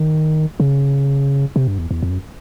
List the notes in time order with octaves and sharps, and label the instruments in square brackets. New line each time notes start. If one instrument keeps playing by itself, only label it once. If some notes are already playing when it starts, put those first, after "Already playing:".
Already playing: [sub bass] D#3
C#3
C3
G2
E2
E2
F2
F#2